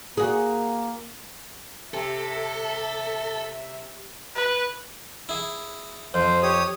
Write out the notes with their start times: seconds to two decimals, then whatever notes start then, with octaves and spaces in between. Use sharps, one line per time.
0.17 A#3 F#4 G#4
1.94 C3 A4 E5
4.35 B4
5.29 E4 G#4
6.14 F2 C5
6.43 G4 C#5 D#6